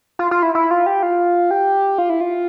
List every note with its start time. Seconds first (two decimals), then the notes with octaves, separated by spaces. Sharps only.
0.19 F4
0.31 F4
0.43 E4
0.55 E4
0.71 F4
0.86 G4
1.03 F4
1.51 G4
1.98 F4
2.10 E4
2.21 F4